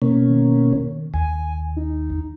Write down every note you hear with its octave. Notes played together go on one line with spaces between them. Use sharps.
B2 A#3 C#4
D#3
D#2 G#5
D#4